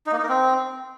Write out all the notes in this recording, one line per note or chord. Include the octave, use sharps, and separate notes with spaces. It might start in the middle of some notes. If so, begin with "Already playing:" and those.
D#4
A#3
D#4
A#4
C4